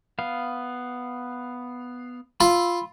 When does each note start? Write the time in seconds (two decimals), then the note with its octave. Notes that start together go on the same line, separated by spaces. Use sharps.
0.19 B3 F5
2.41 F4 B5 C6 E6